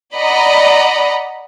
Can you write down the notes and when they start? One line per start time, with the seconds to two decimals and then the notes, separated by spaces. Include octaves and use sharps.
0.17 D5 D#5 F#5 A#5 B5